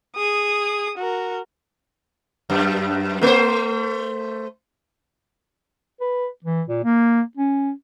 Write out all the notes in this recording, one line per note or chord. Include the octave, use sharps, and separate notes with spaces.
G#4 D#6
F#4 A#4
F#2
A3 C5
B4
E3
A#2
A#3
C#4